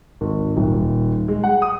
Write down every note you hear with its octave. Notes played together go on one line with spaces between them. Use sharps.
G#1
D#1
G#3
F#5
D#6